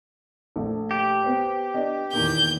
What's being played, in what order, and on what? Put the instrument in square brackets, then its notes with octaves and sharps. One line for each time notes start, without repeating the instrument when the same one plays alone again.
[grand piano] A#1 A3
[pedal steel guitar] G4
[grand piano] B3 C5
B3 D4 D#5
[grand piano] E2 A#2 D#3 [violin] G6